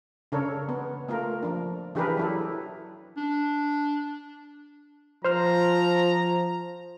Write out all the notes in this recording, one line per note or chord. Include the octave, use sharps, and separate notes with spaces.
C#3 D4 A4 A#4 C#5
B3
A3 A#3 F4 A#4
F3 D4
E3 D4 G4 G#4 A#4 B4
F#3 E4 A4
D4
F3 C5 A#5 F6